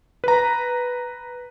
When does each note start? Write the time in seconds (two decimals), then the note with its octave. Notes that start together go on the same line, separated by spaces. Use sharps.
0.24 B4 A#5